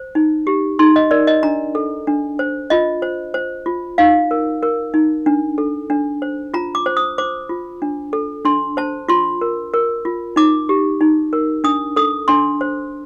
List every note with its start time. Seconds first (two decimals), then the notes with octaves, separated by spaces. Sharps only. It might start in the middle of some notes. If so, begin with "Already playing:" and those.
Already playing: C5
0.15 D#4
0.47 G4
0.79 D#4 C6
0.96 D#5
1.11 A#4 D5
1.27 D#5
1.43 D4 A#5
1.75 A4
2.07 D4
2.39 C5
2.70 F4 D#5
3.02 C5
3.34 C5
3.66 F4
3.98 D#4 F5
4.31 A#4
4.63 A#4
4.94 D#4
5.26 D4
5.58 A4
5.90 D4
6.22 C5
6.54 F4 A#5
6.75 D6
6.86 C5
6.97 D#6
7.18 C5 D6
7.49 F4
7.82 D4
8.13 A4
8.45 D4 C6
8.77 C5 A5
9.09 F4 C6
9.41 A#4
9.74 A#4
10.05 F4
10.36 D#4 D6
10.69 G4
11.01 D#4
11.33 A#4
11.64 D4 D#6
11.96 A4 D#6
12.28 D4 C6
12.61 C5